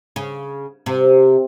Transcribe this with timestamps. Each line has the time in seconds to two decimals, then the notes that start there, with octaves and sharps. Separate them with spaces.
0.16 C#3
0.86 C3